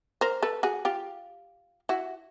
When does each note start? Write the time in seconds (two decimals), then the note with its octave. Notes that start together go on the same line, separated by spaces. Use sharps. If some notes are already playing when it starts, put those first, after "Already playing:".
0.21 A#4 C5
0.42 A4 B4
0.63 F#4 G#4
0.85 F4 G4
1.89 E4 F#4